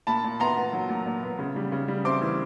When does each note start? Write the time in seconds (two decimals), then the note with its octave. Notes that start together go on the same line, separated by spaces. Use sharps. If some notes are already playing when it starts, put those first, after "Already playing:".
0.07 A#2 A5 B5
0.24 A#2
0.40 B3 A#5 C6
0.56 B3
0.73 F#3
0.89 A#2
1.06 A#2
1.23 B3
1.39 C#3
1.56 G3
1.72 C#3
1.88 G3
2.05 C4 C6 D6
2.22 E3